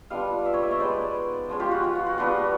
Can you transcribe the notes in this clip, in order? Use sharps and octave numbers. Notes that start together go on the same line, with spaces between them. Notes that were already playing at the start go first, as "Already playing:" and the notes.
G3 B3 D4 F4 D#5 F5
D5 E5
C#5 D#5
D5 E5
C#5 D#5
G#3 B3 D#4 C5 D5
F3 G#3 C#4
F4 G4
F#4
F4
F#4
F#4
G3 B3 D4 F4 F#4